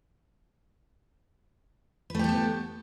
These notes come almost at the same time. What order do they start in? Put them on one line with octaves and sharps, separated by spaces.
B4 A3 G4 A4 B3